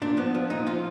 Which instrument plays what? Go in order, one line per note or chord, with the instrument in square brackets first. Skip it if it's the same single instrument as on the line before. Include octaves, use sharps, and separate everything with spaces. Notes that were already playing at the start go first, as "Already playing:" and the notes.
[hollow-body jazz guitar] A#2 D4
F3 B3
F3
A#2 D#4
F3 F4